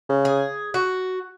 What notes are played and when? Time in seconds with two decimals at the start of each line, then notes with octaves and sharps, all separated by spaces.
0.09 C#3
0.25 G#4
0.74 F#4